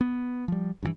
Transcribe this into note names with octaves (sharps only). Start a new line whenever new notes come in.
B3
F3 G3
G2 C#3 E3